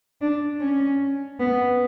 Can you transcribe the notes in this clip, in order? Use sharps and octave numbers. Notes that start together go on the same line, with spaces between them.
D4
C#4
B3